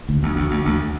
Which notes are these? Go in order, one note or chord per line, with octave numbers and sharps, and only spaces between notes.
D2
D2
D2
D2
D2